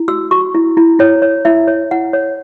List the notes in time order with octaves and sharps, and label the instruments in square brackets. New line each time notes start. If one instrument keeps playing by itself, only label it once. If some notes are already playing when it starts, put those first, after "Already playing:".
Already playing: [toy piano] E4
F#4 E6
F#4 C#6
E4
E4
E4 C#5
C#5
E4 E5
C#5
E4 F#5
C#5